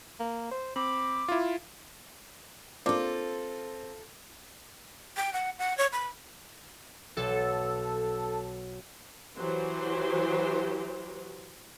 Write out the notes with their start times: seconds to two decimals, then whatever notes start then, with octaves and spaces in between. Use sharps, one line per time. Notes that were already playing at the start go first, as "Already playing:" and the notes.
0.20 A#3
0.51 C5
0.76 C4 B5 D6
1.28 E4 F4
2.86 A#3 C4 D4 F4 A4 D6
5.17 G5
5.33 F#5
5.59 F#5
5.78 C#5
5.93 B5
7.17 B1 A4
9.36 E3 F#3 G4 C5